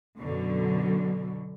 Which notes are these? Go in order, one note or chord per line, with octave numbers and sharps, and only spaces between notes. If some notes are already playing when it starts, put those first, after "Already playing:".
F#2 B2 D3 F#3